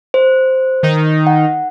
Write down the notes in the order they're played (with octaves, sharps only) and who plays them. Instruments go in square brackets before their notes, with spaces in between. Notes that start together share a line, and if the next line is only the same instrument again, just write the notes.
[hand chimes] C5
[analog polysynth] D#3 D#4
[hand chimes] F#5